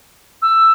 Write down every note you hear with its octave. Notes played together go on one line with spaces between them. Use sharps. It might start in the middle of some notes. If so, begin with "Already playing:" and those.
E6